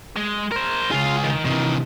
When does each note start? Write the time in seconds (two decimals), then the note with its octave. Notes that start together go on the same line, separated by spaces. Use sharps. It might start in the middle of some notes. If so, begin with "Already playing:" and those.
0.16 G#3
0.52 A#4 C5
0.91 C#2 F4 G#4 F5
1.24 D#3
1.45 C3 D#3 E3